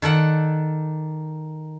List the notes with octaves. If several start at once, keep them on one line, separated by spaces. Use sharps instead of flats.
D#3 A4 D5 F#5